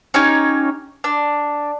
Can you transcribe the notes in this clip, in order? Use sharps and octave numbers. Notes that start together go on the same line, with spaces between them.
C#4 D#4 G4 C#5
D4